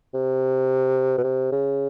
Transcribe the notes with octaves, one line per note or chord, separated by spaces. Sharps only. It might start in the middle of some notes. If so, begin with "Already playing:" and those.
C3
B2
C3
C#3